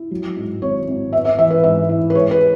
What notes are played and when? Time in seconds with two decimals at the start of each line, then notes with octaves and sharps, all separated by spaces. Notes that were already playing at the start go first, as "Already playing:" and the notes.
Already playing: E4
0.11 F#3
0.36 G#2
0.62 G#1 C#5
0.88 G#1
1.13 B3 E5
1.25 E5
1.39 E3 E5
1.50 B4
1.64 G#2 E5
1.89 E4
2.10 B4
2.14 G#3 C#5
2.31 B4